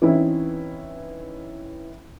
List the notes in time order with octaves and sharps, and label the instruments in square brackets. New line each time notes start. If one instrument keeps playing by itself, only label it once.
[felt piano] E3 C4 C#4 D#4 E4